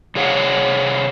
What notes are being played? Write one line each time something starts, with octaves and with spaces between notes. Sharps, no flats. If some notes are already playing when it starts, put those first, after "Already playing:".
C3 G#4 C#5 F5 F#5